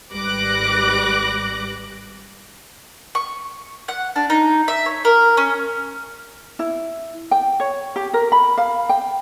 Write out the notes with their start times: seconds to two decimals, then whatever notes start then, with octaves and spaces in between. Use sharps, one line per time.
0.12 G#1 G3 B4 D6 F#6 A#6
3.15 C#6
3.88 F#5
4.16 D4
4.30 D#4
4.68 E5
4.86 C#5
5.05 A#4
5.37 C#4
6.59 E4
7.31 G5
7.60 C#5
7.96 G4
8.14 A#4
8.32 B5
8.58 F5
8.89 G5